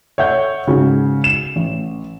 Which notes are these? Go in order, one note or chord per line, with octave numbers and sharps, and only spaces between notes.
C#5 E5 F#5 G6
G#2 C#3 F#4
E7
A1